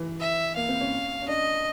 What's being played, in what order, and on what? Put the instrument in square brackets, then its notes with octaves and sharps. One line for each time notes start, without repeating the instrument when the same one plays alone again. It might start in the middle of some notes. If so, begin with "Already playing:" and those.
Already playing: [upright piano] E3
[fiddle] E5
[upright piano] A#3 [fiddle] F5
[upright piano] C4
C#4
C#4
[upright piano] D4 [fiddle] D#5